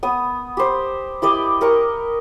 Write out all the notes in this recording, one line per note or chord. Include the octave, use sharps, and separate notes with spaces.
B3 D#6
G4 C5
E4 G4 D5 D#5
G4 A#4 C#6 D#6